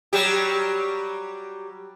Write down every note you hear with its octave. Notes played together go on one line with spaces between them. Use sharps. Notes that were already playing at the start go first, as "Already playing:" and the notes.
F#3 G3 G4